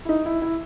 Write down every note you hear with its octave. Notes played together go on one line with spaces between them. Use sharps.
E4
D#4
E4
E4